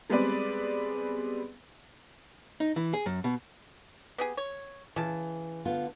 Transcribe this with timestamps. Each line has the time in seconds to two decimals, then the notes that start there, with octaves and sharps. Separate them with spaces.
0.10 G3 G#3 B3 C4 B4 D5
2.60 D#4
2.76 E3
2.93 G#4
3.06 F#2
3.24 B2
4.18 B3 G4 G#4
4.37 C#5
4.96 C#3 E3 A5
5.65 D3 B3 F4